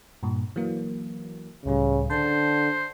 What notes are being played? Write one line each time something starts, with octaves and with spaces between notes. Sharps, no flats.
G2 A#2
E3 F#3 A#3
C#2 A2 C#3 G3
D3 C5 A5